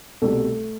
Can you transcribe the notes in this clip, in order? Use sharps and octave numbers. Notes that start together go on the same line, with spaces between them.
C2 B2 G3 A3 A4